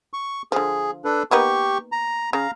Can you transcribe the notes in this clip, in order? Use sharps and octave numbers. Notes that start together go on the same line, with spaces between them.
C#6
D3 F3 G#4
D4 A4 B4
A#3 B3 D#4 G4 C#6
A#5
C#3 F5 A#5